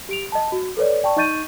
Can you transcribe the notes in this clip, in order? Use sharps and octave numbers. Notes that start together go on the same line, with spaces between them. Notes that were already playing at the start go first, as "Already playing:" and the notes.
G4 D7 F7
D#5 A5
F#4
A4 B4 C#5 D5
D5 G5 A5 C#6
D#4 D#5 C#6 G6 A6 D#7